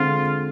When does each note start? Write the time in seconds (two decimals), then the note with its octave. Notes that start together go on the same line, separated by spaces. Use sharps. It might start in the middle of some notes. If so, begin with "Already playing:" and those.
Already playing: D3 G#3 C4 F4